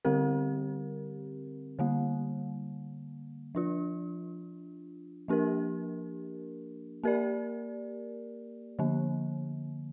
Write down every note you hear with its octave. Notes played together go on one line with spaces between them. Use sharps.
D3 G3 C4 G4 A#4
D3 G3 A#3
F3 D4 F4
F3 A#3 D4 G4 A#4
A#3 G4 A#4 D5
D3 F3 A#3